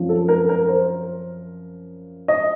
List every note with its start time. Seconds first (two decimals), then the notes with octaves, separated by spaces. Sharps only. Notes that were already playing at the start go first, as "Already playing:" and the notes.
Already playing: F#2 F3 C4 F4
0.09 A4
0.28 A#4
0.49 A#4
0.68 C5
2.28 D#5